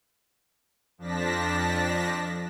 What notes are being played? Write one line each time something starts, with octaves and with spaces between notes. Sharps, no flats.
F2 F3 D4 A5 A#6 B6